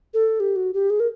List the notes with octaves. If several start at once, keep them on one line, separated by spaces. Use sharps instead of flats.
A4
G4
F#4
G4
G#4
A#4